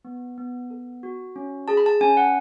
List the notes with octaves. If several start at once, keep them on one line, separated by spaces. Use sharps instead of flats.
B3
B3
A4
F#4
C#4
G#4 A5
B5
A5
C#4 G#5
F#5